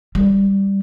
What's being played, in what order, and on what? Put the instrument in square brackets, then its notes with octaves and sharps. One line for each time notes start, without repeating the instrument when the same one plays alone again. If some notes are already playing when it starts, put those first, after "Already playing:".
[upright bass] G3